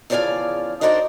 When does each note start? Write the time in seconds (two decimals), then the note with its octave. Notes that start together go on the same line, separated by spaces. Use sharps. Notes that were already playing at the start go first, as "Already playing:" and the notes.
0.10 E2 C#3 F3 D5 F5 G#5
0.81 D4 D#4 F#4 A#4 C5 D5